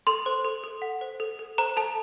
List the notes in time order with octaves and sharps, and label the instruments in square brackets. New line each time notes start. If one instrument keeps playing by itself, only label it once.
[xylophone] A4 C6
C5
A4
A4
F#5
C5
A4
A4
C5 A#5
A4 A5